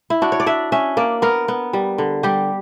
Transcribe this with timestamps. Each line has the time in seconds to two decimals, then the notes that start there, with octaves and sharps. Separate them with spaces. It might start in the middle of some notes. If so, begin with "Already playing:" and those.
0.10 E4
0.22 D4 F#4
0.32 C#5
0.40 D5
0.46 D4 E5
0.72 C#4 E5
0.97 A#3 D5
1.22 B3 A#4
1.48 B3
1.73 G3
1.98 D3
2.23 G3 G4